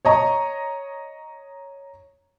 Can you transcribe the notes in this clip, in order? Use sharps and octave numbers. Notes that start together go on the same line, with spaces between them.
C#5 D#5 A#5 C#6